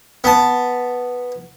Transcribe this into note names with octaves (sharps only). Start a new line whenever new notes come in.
B3 A5